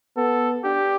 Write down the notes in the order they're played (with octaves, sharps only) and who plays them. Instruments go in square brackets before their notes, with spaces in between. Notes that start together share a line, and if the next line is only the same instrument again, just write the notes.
[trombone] B3 [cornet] A4
[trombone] D4 [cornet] G4